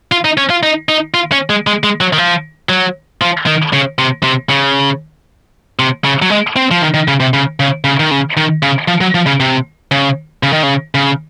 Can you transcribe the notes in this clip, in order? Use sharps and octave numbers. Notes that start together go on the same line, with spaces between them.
F4
D#4
C#4
F4
D#4
D#4
F4
C#4
G#3
G#3
G#3
F#3
D#3
F3
F#3
F3
D#3
C#3
C3
C3
C#3
C3
C#3
F#3
G#3
C4
F3
D#3
D#3
C#3
C3
C#3
C#3
C#3
D#3
C#3
D#3
C#3
F3
F#3
F3
C#3
C3
C#3
C#3
D#3
C#3
C#3